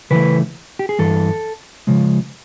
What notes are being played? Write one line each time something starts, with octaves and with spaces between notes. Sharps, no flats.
C#3 E3 A3 B4
G4
G#4
G2 E3 A4
C#3 F3 G#3